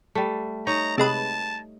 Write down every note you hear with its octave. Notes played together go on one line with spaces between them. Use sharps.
G3 A3
D#4 C#5 D#5 A#5
C3 G#3 B4 A5